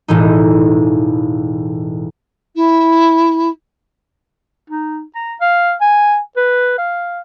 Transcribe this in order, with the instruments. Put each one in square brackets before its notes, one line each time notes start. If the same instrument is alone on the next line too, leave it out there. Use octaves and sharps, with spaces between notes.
[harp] E1 A2 E3 D#4
[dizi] E4
[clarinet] D#4
A#5
F5
G#5
B4
F5